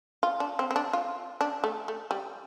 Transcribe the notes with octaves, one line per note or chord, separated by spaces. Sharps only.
F4
D4
C4
C4
D4
F4
D4
A3
A3
G3